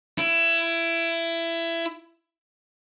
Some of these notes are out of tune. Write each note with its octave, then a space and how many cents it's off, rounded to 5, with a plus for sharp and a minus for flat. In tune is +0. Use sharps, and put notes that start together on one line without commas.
E4 +20